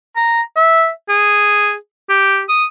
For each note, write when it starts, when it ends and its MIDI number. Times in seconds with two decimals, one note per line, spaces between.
0.16 0.41 82
0.56 0.89 76
1.09 1.74 68
2.09 2.42 67
2.49 2.65 87